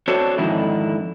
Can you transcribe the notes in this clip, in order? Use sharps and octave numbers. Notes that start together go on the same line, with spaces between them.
C4 D4 F#4 A4 C5 C#5
F2 G#2 D3 D#3 E4